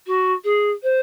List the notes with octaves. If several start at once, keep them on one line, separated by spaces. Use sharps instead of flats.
F#4
G#4
C5